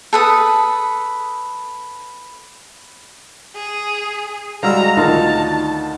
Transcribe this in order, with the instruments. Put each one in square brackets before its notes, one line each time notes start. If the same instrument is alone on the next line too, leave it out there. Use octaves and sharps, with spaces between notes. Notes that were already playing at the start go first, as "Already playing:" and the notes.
[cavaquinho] A4 B4 D#6
[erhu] G#4
[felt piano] G3 G#3 F#4 [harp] F5 E6 [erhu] A#5
[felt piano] D2 D#3 [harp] D#4 F4 [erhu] A5